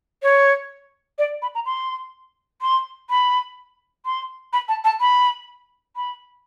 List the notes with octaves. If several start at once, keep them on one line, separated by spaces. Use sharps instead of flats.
C#5
D5
B5
A#5
C6
C6
B5
C6
B5
A5
A5
B5
B5